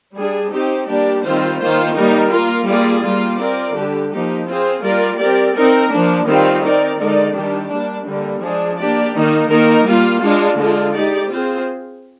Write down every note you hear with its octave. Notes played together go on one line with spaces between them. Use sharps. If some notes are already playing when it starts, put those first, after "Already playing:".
G3 D4 G#4
C4 D#4 G4 C5
G3 A#3 D4 G4 D5
D#3 G3 C4 F4 C5
D#3 A#3 F4 C5
G3 A#3 D#4 A#4
A#3 F4 A#4
G3 A#3 F4 G#4 D5
G3 A#3 F4
C4 F4 A#4 D5
D3 G3 D4 G4
F3 A#3 D#4 G4
C4 F4 G#4 C5
G3 A#3 F4 A#4 D5
C4 G4 A#4 D5
C4 D#4 A#4
F3 A#3 D4
D#3 G3 C4 F4
C4 D#4 A#4 D5
D3 G#3 D#4 A#4 D5
D#3 G3 D4 G4
G3 A#3 D4
D3 G3 A#3
F3 G#3 D4 G#4
A#3 D4 G4 D5
D#3 A#3 D#4
D#3 A#3 D#4 A#4
G3 A#3 F4
G#3 D4 F4
D3 G#3 D4 F4 G#4
G#3 D#4 G4 D5
C4 F4 G#4 C5